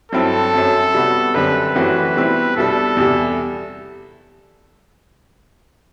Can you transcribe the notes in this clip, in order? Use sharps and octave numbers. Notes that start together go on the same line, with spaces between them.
G2 F#3 C4 E4 A4
F#2 F#3 C4
C3 G3 B3 F#4
F#2 D3 G3 C4 B4
F#2 E3 A3 C4 F#4
B2 G3 C4 E4
C2 B2 G3 D4 A4
E2 C3 G3